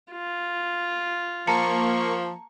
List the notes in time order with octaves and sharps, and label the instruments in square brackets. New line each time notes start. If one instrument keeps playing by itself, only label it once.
[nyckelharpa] F4
[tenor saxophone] F3 [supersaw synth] A#3 C#6 [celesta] A5 A#5 C#7